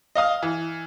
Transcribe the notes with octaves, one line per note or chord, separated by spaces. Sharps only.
D#5 F5 D#6 F6
E3